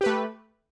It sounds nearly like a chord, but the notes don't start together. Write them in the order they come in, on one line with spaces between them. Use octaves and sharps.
G4 B4 A3